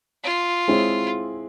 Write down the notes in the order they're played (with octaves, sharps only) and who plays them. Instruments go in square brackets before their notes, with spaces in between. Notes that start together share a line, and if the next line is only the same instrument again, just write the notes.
[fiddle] F4
[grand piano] G#3 C4 E4 G#4 C#5